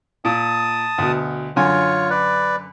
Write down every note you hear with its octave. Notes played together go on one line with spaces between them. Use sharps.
A#2 A5 D#6
D2 B2
F#2 D3 F4 C#5 G#5
B4 D5